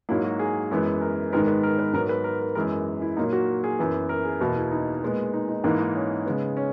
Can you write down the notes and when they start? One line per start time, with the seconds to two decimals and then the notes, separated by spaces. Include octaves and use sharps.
0.09 G#2 F#3 A#3 E4
0.24 F#4
0.39 G#4
0.71 F#2 E3 G#3 B3
1.02 A#4
1.32 G#2 D#3 G#3 B3 A#4
1.48 B4
1.63 A#4
1.79 B4
1.93 G#2 F#3 B3 A#4
2.09 B4
2.24 A#4
2.40 A#4
2.55 F#2 E3 G#3 B3 A#4
3.02 E4
3.17 A#2 F#3 A#3 D#4
3.33 F#4
3.64 G#4
3.79 F#2 E3 B3
4.09 A#4
4.25 G#4
4.41 E2 B2 A#3 F#4
4.56 E4
4.72 D#4
5.02 A#2 G#3 B3
5.34 D#4
5.49 D#4
5.64 G#2 E3 A#3 D#4
5.79 D#4
5.95 C#4
6.26 C#3 G#3 B3
6.57 C#4